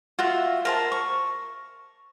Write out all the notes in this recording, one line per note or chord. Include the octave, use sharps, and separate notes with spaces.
F4 F#4 E5
A#4 C5 A5
C#6